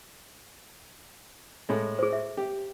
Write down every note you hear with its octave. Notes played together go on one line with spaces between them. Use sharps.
A2 G#3
G#4 C5
E5
G4